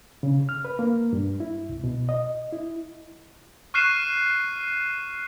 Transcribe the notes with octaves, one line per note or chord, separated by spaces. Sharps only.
C#3
F6
B4
A#3
G2
E4
C2
B2
D#5
E4
C#6 F6 F#6 C7 D#7 E7